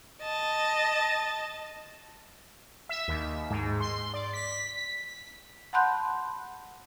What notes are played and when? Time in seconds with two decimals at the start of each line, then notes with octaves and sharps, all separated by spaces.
0.22 D#5 A5
2.89 E5
3.08 D#2
3.50 G#2
3.80 C6
4.14 D5
4.33 B6
5.73 F#5 A5 B5 C6 F#6 G6